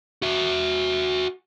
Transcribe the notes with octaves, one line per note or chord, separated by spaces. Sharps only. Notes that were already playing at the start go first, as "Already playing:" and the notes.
F#4 E5